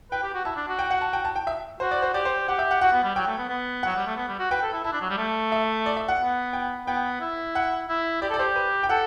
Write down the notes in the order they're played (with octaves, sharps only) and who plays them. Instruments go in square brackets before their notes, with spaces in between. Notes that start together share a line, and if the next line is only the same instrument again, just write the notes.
[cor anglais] B4 [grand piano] G5
[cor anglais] G4
F#4
[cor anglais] E4 [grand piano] A5
[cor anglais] D4
F#4
[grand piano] G5
F#5
A5
G5
A5
G5
E5
[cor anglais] F#4 [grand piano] C5
[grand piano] D5
C5
[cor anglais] G4 [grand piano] D5
[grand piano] C5
[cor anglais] G4 [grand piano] F#5
[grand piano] E5
F#5
[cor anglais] F#4 [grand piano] F#5
[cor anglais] B3
G3
[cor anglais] F#3 [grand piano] G5
[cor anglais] A3
B3
B3
[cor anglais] F#3 [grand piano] F#5
[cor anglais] G3
A3
B3
G3
F#4
[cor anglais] B4 [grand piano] G5
[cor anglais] A4
E4
[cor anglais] E4 [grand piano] A5
[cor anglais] D4
F#3
G3
A3
[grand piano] E5
D5
E5
F#5
[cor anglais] B3
[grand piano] G5
[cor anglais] B3 [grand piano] G5
[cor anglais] E4
[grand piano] F#5
[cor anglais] E4
[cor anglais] G4 [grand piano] D5
[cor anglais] A4
[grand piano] D5
[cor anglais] G4 [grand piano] C5
[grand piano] B4
G5
[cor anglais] A4 [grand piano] F#5